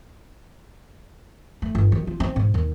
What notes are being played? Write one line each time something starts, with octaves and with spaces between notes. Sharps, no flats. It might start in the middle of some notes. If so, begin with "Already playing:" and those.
A3
G1
D#3
F4
C4
G#2
D#2